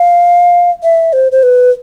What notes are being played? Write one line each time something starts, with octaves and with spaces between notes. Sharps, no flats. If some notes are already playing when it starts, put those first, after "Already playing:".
Already playing: F5
E5
C5
C5
B4